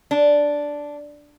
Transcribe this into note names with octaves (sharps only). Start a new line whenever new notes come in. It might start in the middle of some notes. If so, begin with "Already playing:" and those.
D4